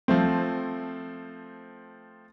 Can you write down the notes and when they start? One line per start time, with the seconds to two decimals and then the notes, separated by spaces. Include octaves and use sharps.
0.08 F3 A3 C4